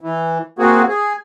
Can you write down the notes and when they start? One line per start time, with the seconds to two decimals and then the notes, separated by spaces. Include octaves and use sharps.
0.01 E3
0.59 A#3 C4 F#4 G#4
0.88 G#4